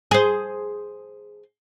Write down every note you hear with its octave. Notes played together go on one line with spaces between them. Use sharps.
G#4 C5